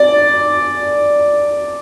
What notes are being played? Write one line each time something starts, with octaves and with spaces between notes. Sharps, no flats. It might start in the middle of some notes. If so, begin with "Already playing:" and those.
Already playing: D5